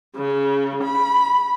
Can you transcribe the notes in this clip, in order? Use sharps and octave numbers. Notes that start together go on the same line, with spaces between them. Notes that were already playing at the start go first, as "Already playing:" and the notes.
C#3
B5